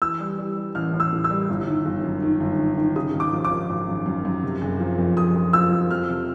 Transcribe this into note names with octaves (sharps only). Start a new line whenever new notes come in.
E3 E6
G3
G3
G3
A1 F6
A1
E6
A2
E6
G3
G1
D#3
G1
F#2
D#3
G1
D#3
D#3
C#3 D#6
G#1
D6
F3
D6
G#1
G#1
F#2
F#2
F#2
C3
F#1
F3
F2
F2 D#6
F2
F3 E6
F3
F2 F6
C3